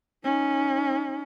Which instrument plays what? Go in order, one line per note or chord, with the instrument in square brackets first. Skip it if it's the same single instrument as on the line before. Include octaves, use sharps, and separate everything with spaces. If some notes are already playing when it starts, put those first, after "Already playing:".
[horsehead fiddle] C#4 D#4